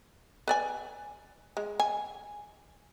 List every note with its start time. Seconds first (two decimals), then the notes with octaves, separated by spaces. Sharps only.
0.48 B4 D5 G#5
1.57 G#3
1.80 G#5